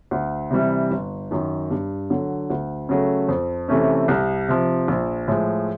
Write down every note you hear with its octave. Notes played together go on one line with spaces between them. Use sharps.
D2
C3 E3 G3
G1
F#2 D#3
G2
D3 F#3
D2
C#3 F#3 A3
F2
C3 E3 A3 C#4
C2
C3 F3
A#1
A2 F3 G#3